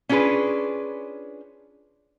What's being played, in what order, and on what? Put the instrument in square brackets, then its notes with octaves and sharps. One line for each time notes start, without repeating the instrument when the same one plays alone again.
[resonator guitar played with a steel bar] C#4 D4 F4 G#4 B4